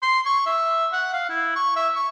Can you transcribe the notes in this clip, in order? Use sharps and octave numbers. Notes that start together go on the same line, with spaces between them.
C6
C#6
E5
F#5
F5
E4
C#6
E5
C#6